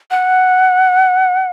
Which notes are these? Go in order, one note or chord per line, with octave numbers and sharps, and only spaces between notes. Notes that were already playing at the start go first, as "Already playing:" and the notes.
F#5